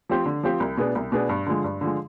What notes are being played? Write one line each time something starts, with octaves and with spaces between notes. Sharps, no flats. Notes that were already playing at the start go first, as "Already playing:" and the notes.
F3 C4 G4
D3
F3 C4 G4
C2
B2 B3 D4 G#4
C2
B2 B3 D4 G#4
G2
D3 F3 G#3
G2
D3 F3 G#3